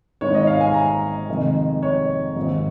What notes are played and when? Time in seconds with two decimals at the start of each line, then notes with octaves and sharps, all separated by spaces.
0.21 G#1 G#2 D#3 G#3 C#5
0.35 D#5
0.47 F5
0.61 G#5
0.74 A#5
1.28 F1 F2 D#3 G#3
1.83 C#5
2.36 G#1 G#2 F3